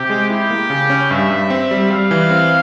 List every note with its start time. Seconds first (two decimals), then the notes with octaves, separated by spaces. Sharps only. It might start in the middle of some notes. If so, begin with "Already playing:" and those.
Already playing: C3 G4
0.10 G#3
0.29 E4 G4
0.50 A#3
0.70 C#3
0.90 C#4
1.11 G2 E5
1.31 G2
1.50 C4
1.71 G3
1.90 G3 F5
2.11 E3
2.30 C4